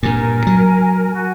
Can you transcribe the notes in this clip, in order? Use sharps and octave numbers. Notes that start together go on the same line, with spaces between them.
G2 A#2 A#4 G#5
F#3
F#4 G#5